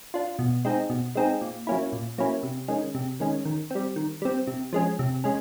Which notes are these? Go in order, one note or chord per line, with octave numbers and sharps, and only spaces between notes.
D4 F4
B2
G#3 C4 D#4 G#4
B2
G#3 C4 D#4 G#4
A#2
F#3 A#3 C#4 E4
A#2
F#3 A#3 C#4 E4
C3
D#3 G#3 C#4
C3
D#3 G#3 C#4
D#3
G3 C4
D#3
G3 C4
C3
F3 G#3 C#4
C3
G#3 C#4